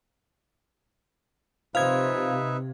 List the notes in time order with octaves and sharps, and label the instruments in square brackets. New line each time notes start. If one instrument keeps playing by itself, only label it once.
[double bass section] C3 [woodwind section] F3 [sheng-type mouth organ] D#4 B4 E5 [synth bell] F5 G#6